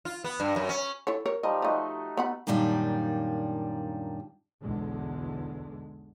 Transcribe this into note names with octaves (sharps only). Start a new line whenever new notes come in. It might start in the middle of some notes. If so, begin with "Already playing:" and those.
F4
B3
G2
F#2
C#4
E4 A4 C#5
A#4 C#5
F3 G3 D#4 D#5
F3 A3 D#4 F#4 D#5
B3 F#5 B5
F#2 A#2 D#3 G3 D4
B1 E2 D3 G#3